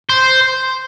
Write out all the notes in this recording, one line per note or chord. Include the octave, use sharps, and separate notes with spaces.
C5